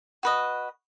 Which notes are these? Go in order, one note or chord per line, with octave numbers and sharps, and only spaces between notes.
F#4 B4 D#5